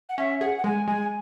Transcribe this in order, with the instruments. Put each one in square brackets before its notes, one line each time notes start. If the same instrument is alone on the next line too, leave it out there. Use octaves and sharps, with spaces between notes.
[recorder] F#5
[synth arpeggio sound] C#4 [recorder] E5
[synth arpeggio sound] G#4 [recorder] F#5
[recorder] F#5
[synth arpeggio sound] G#3 [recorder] G#5
[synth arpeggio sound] G#3 [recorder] G#5